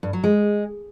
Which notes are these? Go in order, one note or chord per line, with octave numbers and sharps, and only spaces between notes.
G2
F#3
G#3